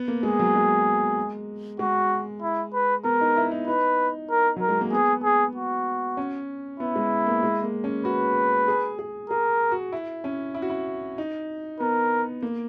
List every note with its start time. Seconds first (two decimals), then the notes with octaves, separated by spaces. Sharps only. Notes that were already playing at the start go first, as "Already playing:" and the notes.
Already playing: B3
0.08 A#3
0.23 G#3 G#4
0.39 F#3
0.55 G#3
1.79 G#3 F#4
2.42 E4
2.74 B4
3.04 B3 A#4
3.21 D#4
3.37 E4
3.51 D#4
3.67 D#4 B4
4.30 A#4
4.56 F#3 A#4
4.69 G#3
4.81 A#3
4.92 B3 G#4
5.24 G#4
5.55 F#4
6.17 C#4
6.80 B3 E4
6.96 G#3
7.27 A#3
7.43 G#3
7.63 A#3
7.84 C#4
8.05 F#4 B4
8.68 G#4
8.99 G#4
9.30 G#4 A#4
9.72 F#4
9.92 E4
10.24 C#4
10.55 E4
10.62 F#4
10.70 E4
11.18 D#4
11.80 B3 A#4
12.43 A#3